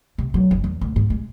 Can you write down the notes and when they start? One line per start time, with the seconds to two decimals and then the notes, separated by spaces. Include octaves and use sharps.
0.18 C3
0.34 F#3
0.51 F#1
0.64 E2
0.81 D2
0.96 G#2
1.10 G#3